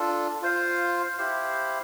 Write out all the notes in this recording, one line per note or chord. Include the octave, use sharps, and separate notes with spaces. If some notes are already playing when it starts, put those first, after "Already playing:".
Already playing: D4 F4 A4
F4 C5 F5
E4 G4 C5 F5